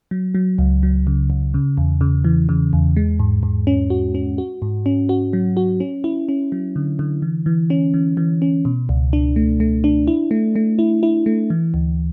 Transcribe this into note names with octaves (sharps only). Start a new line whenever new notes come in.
F#3
F#3
C#2
F#3
C#3
C#2
C#3
E2
C#3
E3
C#3
E2
G#3
G#2
G#2
C#4
F#4
C#4
F#4
G#2
C#4
F#4
F#3
F#4
C#4
E4
C#4
F#3
D3
D3
E3
E3
C#4
E3
E3
C#4
B2
C#2
D4
A3
A3
D4
E4
A3
A3
E4
E4
A3
E3
D2